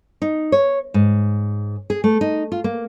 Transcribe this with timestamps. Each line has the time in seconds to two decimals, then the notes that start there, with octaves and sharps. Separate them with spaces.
0.22 D#4
0.52 C#5
0.94 G#2
1.90 G#4
2.04 A3
2.21 D#4
2.52 F4
2.64 A#3